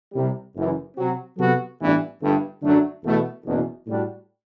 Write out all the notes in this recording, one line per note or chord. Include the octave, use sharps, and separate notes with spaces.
C2 C3 G3
F#1 F#2 E3
C3 F#3 C4 F#4
C3 F#3 B3 F#4 A4
A1 G2 E3 B3 D4
G1 G2 D3 A3
F#2 D3 F#3 A3 D4
E2 B2 A3 E4
F#1 E2 B2
A2 G3 D4 F#4